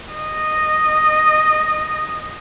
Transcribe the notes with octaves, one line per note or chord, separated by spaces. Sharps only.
D#5